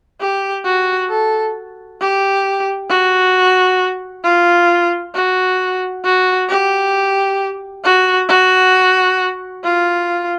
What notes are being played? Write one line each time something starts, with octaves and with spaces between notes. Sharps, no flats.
G4
F#4
A4
G4
F#4
F4
F#4
F#4
G4
F#4
F#4
F4